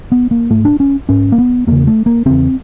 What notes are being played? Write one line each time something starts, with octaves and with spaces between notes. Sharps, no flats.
B3
A#3
G#2 A3
D4
C#4
G#2 C#4
A#3
B3
E2 C#3 A#3
A3
A#3
E2 C#3 C4